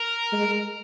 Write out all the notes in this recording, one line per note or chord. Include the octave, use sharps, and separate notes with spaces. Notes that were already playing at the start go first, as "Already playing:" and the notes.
Already playing: A#4
G#3